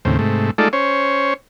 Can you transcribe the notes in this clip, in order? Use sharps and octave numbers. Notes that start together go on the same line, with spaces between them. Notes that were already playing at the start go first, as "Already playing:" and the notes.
D#2 A2 C#3 C4
G#2 C3 A3
G#3 A3 D#4 F4 A4 D5
C#4 C5 C#5